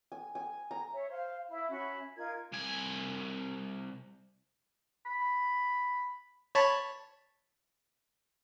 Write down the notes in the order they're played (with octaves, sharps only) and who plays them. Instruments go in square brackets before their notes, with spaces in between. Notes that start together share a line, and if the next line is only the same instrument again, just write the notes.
[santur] G#5
G#5
A#5
[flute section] C#5 E5
C5 F5
E4
C#4 F#4 E5 B5
D#4 F4 A#4 G#6
[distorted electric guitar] C2 G#5
[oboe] B5
[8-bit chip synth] C#5 A5 B5